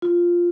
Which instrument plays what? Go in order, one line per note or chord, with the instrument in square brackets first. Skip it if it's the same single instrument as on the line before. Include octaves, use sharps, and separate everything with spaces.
[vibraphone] F4